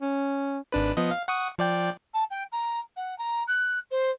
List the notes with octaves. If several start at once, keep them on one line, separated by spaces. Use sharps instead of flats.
C#4
G#1 D4 B4
F3 B3 D#5
F5
F#5 C#6 D#6
F3 D5 G5
A5
G5
A#5
F#5
A#5
F#6
C5